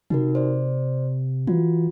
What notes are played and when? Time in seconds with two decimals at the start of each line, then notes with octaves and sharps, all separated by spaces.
0.10 C3 D#4 F#4 A#4
0.35 C5 D5
1.47 E3 F4 F#4